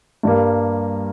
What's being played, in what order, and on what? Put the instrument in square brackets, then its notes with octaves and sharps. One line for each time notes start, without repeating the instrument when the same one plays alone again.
[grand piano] G2 G3 A#3